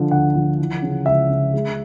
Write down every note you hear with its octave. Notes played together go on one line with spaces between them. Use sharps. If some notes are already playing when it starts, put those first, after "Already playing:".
Already playing: D3 F3
D2 F#5
F3
E3
C#3
C#2 E5
C#3
G#3